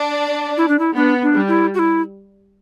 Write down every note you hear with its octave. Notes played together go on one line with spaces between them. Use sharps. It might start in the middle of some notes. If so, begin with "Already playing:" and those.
Already playing: D4
E4
D4
E4
B3 D4
D4
G3
E4
F#4
E4